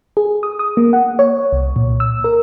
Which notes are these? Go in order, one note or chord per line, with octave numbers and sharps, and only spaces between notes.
G#4
D#6
D#6
A#3
F#5
C#5
C2
A#2
E6
A#4